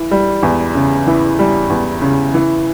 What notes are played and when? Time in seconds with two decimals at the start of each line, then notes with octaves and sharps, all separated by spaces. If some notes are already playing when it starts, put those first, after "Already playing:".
Already playing: E3
0.11 G3
0.43 E2
0.75 C#3
1.07 E3
1.39 G3
1.70 E2
2.01 C#3
2.34 E3